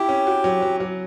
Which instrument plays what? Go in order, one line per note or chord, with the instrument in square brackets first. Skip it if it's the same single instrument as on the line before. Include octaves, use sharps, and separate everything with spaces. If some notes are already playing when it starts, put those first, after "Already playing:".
Already playing: [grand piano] E4 [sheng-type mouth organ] G4
[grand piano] C#4
F#4
F#3
F#3
F#3